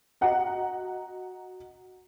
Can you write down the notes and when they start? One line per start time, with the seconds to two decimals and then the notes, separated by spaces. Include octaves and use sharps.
0.21 F#4 D#5 F#5 A#5